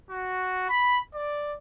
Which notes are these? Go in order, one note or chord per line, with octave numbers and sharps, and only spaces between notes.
F#4
B5
D5